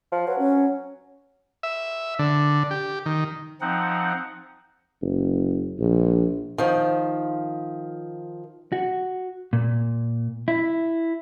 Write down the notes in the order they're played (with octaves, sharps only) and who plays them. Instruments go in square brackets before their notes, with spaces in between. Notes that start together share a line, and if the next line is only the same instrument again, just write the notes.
[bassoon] F3
[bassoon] F#3 [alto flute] B4
[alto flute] C#4
[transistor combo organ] E5
D3
G4
D#3
[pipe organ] F3 C4 D#4 F#5
[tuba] F#1
A#1
[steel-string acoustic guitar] D#3 F3
[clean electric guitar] F#4
A#2
E4